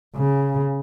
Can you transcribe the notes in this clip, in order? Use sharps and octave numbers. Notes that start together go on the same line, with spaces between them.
C#3